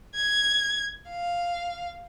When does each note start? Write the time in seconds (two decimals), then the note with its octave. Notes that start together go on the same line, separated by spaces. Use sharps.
0.14 G#6
1.08 F5